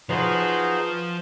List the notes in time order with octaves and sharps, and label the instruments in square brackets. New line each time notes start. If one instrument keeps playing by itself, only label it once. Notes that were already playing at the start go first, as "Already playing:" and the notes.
[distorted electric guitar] F3 [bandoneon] D#4 F#4 G#4 [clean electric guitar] B4 C5